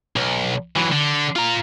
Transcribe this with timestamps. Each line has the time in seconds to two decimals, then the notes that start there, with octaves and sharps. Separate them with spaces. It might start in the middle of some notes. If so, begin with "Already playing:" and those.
0.16 B1
0.76 E3 F#3
0.92 D3
1.36 F4 A#5